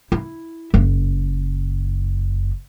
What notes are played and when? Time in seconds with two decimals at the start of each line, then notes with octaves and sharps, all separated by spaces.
0.12 E4
0.74 F#1